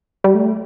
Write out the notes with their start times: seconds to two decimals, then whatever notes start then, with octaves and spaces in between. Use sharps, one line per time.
0.24 G3
0.35 A3